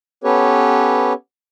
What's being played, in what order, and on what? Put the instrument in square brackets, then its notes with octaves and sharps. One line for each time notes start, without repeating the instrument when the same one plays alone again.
[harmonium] B3 C#4 G4 A4 B4 C#5